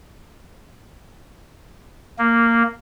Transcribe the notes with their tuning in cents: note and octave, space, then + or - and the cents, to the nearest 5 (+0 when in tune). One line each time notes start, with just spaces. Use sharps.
A#3 -10